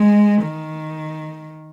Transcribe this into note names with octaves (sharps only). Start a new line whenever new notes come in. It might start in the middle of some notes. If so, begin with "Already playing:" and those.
Already playing: G#3
D#3